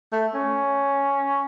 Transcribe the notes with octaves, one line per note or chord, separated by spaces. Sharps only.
A3
C#4